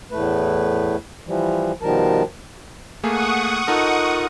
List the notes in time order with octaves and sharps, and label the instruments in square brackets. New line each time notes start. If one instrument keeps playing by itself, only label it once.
[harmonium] E2 A2 A3 B4
E3 F3 G3
B2 D#3 F3 G3 A#4 A5
[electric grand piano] A3 A#3 G#4 [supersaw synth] F#5 C#6 D#6
[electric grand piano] D#4 A4 [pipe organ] F4 A#4 D#5